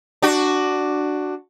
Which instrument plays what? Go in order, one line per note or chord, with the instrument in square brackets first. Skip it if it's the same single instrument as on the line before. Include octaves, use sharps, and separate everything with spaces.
[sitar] D4 F#4